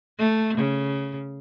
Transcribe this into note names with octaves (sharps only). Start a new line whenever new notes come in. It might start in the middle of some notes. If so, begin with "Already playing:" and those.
A3
C#3